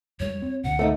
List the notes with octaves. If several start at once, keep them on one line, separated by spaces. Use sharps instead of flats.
F2 G3 G#3 C#5
C4
C#2 A#2 D3 F#5
A3 C4 D#4